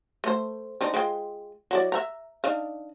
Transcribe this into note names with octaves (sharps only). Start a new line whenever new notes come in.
A3 C5
C4 D4 D#4
G#3 F4 G5
F#3 E4 D5
E5 F#5 A#5
D4 D#4 F5